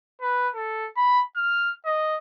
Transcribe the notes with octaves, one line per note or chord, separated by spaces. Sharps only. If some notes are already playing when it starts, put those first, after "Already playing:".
B4
A4
B5
F6
D#5